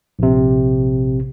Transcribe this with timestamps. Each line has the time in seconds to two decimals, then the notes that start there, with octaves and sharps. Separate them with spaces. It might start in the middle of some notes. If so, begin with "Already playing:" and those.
0.19 A#1 C3